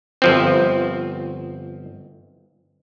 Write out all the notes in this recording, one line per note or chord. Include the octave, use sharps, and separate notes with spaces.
G1 F3 C4